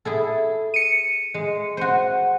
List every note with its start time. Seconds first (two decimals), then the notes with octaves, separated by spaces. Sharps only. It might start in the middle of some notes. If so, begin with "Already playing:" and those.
0.05 E4 G#4 A4
0.74 C#7 D#7
1.34 G#3
1.77 F#4 C5